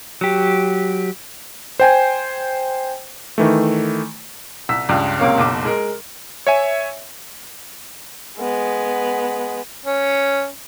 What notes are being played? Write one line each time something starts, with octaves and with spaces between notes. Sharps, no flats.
F#3 G4
C5 G5 G#5
D#3 E3 A3
C2 E6 B6
C#2 G2
C#2 C3 A#3 A#4 C#5 F5
F#1 B1 D6
G#3 A#4
C#5 E5 G#5
G#3 B3
C#4